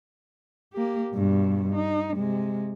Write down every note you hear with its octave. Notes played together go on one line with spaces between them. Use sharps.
A#3 G4
G2 B2
D#4
C3 G#3